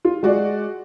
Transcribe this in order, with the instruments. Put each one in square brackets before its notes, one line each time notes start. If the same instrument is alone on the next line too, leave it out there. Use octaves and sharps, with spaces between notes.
[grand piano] F4
G#3 F#4 D5